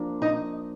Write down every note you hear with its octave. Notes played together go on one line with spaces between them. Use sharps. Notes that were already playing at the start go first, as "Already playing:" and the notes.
Already playing: F3 A#3 D4
D#4 D#5